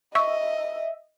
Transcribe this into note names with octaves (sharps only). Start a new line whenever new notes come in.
D#5 E5 C#6